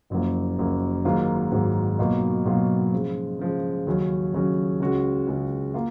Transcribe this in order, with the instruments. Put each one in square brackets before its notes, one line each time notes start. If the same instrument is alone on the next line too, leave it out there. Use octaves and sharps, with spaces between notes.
[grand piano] F#1 F#2 F3 A#3
F#1 F#2 F3 A#3
G#1 G#2 F#3 A#3 F4
G#1 G#2 F#3 A#3 F4
B1 B2 F#3 A#3 F4
B1 B2 F#3 A#3 F4
C#3 F3 G#3
C#3 F3 G#3
D#2 C#3 F#3 C#4 F#4
D#2 C#3 F#3 C#4 F#4
C#2 C#3 G#3 C#4 F#4
C#2 C#3 G#3 C#4 F#4
A#3 F4